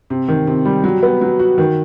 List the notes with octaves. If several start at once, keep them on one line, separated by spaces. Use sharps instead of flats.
C3
D#3
C3
G3
F#3
B3
F#3
F#4
D#3